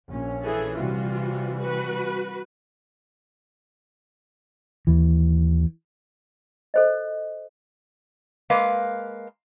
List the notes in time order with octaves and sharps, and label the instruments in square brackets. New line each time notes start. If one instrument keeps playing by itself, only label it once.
[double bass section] A#1 C#4
[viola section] E3 G#4 A4
[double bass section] C3 E3 G3 [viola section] F4 F#4
[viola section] F#4 B4
[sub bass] D#2 [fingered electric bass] E3
[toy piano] A4 C5 D#5
[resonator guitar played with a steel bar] G#3 A#3 B4 F5